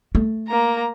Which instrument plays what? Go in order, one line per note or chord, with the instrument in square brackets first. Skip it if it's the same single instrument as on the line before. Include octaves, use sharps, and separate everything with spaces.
[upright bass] A3
[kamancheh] A#3 A#5